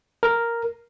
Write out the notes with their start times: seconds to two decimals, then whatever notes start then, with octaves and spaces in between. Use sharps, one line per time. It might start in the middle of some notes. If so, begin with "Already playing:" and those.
0.23 A#4